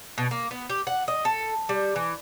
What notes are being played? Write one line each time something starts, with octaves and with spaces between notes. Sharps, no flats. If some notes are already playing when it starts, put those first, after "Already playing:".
B2
A#3
B3
G4
F#5
D#5
A4
G3
E3